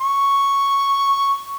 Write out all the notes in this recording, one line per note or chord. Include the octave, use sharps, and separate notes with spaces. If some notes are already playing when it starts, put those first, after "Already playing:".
C#6